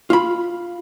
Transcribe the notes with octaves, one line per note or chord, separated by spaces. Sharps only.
F4 B5